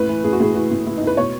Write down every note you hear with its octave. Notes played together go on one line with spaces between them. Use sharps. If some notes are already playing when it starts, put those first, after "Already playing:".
Already playing: A2 B4
E3
A2 G#4
F#4
A2 G#4
E3 F#4
A2
A2 E4
D#4
A2 B4
B2 C#5